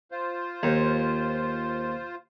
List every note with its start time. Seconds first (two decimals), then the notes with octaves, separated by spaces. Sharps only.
0.12 F4 C5
0.63 D#2